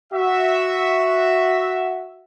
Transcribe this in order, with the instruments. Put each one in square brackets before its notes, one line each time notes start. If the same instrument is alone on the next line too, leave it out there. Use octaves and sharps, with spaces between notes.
[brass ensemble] F#4 E5